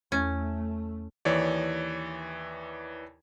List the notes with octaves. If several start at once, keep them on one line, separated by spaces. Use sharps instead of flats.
E2 A3 C#4 G#6 A6
D#2 E3 C#5 D5